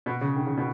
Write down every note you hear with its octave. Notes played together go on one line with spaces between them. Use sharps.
B2
C#3
D#3
C#3
B2